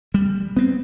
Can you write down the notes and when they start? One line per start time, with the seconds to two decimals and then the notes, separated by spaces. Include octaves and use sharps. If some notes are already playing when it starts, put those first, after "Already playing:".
0.14 G3
0.57 B3 C4